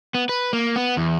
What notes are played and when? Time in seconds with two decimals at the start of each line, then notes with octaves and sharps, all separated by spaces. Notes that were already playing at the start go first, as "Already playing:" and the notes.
0.15 B3
0.29 B4
0.53 A#3
0.76 B3
0.97 E2